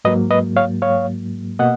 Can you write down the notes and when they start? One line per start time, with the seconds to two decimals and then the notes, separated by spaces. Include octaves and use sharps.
0.05 G#2 F#3 A#3 B4 D#5
0.31 B4 D#5
0.56 C#5 F5
0.82 C#5 F5
1.59 B2 A#3 D#5 F#5